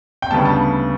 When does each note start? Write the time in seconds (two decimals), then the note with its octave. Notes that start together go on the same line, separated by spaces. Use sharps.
0.22 G5
0.30 D2 C#3 G3 B3 A5
0.45 A5